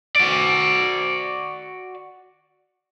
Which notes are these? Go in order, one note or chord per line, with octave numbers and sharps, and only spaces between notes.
F#4 D5